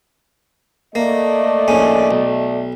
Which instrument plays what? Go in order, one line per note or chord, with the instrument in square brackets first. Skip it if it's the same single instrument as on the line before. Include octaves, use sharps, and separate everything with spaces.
[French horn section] A3 D5 D#5 [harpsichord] A#3
[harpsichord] A#1 A2 C#4
B1